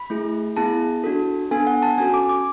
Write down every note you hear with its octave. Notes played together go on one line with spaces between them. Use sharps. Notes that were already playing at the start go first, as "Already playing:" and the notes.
Already playing: B5
A3 E4 G#4
B3 E4 G#4 A5
D4 F#4 A4
B3 D4 A4 G#5
F#5
A5
C#4 F#4 A4 G#5
D6
D6